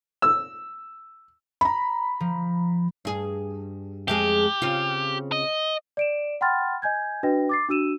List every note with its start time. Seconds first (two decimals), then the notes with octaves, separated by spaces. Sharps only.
0.22 E6
1.61 A#5 B5
2.20 F3
3.05 G2 G#4
4.08 F2 G#3 G4 G#4
4.62 C#3 C4 F4
5.32 D#5
5.97 D5 D7 E7
6.41 F#5 G5 B5 C6 F6 A6
6.82 D#5 G#5 G6 G#6
7.23 D4 F#4 B4 D#5 G5 A#6
7.49 D6 A6 C7
7.69 D4 F#4 E6 D#7 E7